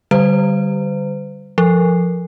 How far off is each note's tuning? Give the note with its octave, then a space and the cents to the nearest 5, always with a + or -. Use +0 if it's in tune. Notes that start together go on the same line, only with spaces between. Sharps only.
D3 +0 G3 +0 C5 -45
F3 +0 A4 +20